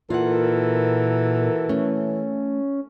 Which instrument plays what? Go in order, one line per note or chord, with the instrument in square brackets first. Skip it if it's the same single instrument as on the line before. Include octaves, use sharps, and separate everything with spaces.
[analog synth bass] A#2 [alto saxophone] E3 [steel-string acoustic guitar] F4 F#5 [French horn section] F#4 A4 A#4
[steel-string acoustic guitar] A3 [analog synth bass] C#4